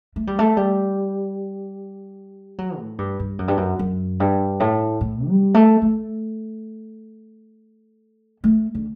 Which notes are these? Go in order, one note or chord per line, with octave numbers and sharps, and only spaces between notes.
A3
G3
A3
G3
F#3
A2
G2
G2
F#2
G2
F#2
F#2
G2
A2
A2
G3
A3
A3
A3
D3